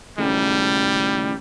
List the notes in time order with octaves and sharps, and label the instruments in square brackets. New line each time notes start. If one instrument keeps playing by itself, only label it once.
[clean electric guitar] D#2 A2 C#3 [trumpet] G3